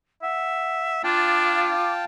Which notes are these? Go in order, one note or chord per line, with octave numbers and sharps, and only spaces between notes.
E5 F#5
D4 F4 F5 G5 A5 D6